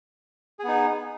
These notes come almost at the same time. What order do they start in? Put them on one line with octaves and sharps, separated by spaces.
G#4 B3 D#4